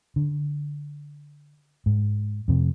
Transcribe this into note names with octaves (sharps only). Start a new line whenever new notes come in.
D3
G#2
F2 C3